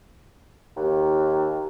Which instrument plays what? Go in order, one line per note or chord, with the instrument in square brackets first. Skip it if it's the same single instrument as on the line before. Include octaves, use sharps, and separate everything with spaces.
[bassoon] D#2